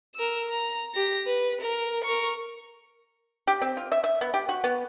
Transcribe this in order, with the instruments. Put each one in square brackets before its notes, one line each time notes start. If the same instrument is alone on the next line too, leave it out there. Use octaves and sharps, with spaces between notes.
[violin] A#4 E6
A#5
G4 A#6
B4
A#4
A#4 C#6
[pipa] G4
C4
F4
E5
E5
B3
G4
F#4
B3